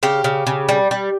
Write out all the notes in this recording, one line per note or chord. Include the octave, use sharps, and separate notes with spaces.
C#3 G4
C#3
C#3
G3
G3